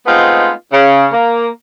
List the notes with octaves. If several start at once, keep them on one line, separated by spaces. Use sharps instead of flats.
G#3 A3 B3 C4 D#4 F4
C#3
A#3